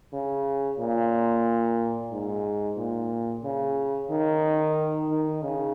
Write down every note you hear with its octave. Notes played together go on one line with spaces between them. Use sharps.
C#3
A#2
G#2
A#2
C#3
D#3
D#3
C#3